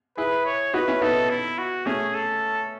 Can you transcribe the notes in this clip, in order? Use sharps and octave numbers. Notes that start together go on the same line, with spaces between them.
E4 G#4 B4
C#5
D#4 F#4 B4
C#4 E4
B3 D#4 A4
E4
F#4
A3 C#4 G#4
A4